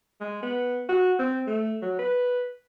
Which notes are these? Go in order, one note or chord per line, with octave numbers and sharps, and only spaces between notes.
G#3
B3
F#4
C4
A3
F#3
B4